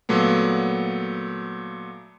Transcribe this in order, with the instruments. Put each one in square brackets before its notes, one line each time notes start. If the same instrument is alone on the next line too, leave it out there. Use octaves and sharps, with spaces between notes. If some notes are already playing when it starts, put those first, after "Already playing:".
[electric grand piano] A#2 F#3 A3 B3